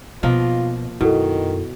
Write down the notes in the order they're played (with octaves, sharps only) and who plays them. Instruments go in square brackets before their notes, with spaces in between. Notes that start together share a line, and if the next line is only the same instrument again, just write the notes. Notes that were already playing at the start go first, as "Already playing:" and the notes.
[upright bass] B2 [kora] F3 A#3 D#5 [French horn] F4
[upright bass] F#2 [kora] B2 [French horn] D#3 [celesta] E4 A4